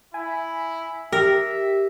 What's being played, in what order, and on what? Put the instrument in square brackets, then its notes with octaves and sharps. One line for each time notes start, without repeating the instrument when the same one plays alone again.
[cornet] E4 [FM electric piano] G#5
[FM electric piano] G4 [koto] A#4 [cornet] E5